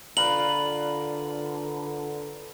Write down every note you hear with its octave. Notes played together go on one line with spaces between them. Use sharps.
D3 F4 A#4 B4 D5 F#7